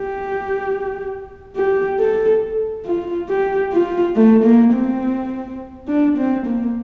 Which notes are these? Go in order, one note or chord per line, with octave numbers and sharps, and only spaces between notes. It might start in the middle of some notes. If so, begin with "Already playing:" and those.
Already playing: G4
G4
A4
F4
G4
F4
A3
A#3
C4
D4
C4
A#3